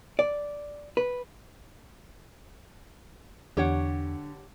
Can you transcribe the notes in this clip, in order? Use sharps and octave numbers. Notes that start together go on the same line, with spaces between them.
D5
B4
E2 D3 G4 C#5 F#5